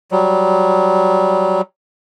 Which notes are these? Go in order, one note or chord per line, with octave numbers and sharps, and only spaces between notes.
F#3 G3